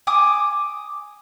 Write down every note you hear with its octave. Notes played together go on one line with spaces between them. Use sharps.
G#5 D6 D#6